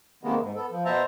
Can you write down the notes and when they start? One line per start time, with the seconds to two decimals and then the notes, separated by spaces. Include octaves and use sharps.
0.23 C3 D#3 G#3 A#3 B3
0.42 G#2
0.56 B3 A4
0.71 F3
0.85 B2 B3 C5 E5 A5 A#5